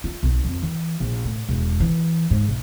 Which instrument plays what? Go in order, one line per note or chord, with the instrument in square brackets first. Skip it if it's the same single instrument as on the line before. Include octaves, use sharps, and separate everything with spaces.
[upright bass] F4
B1
F2
E3
A#1
A2
E1
E3
G#2
B1